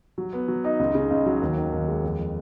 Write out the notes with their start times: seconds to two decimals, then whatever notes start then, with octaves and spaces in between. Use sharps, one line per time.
0.18 F#3
0.33 B3
0.48 F#3
0.64 D#4
0.79 C#2
0.95 C#3
1.10 C#2
1.26 F#3
1.41 D#2
1.57 D#3
1.72 D#2
1.88 G#3
2.03 F2
2.19 F3